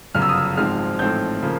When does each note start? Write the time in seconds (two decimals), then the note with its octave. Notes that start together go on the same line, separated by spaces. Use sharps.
0.14 G1 F#2 C#3 F6
0.22 E6
0.29 D#6
0.38 E6
0.57 G#1 G#2 F3 G#3 C4 F6
0.99 A1 G#2 F3 A3 C4 G6
1.43 C#3 F3 A#3